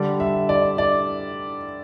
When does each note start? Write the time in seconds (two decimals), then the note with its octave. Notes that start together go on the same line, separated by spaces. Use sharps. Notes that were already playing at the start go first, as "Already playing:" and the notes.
Already playing: D3 G3 D5
0.20 E5
0.49 D5
0.78 D5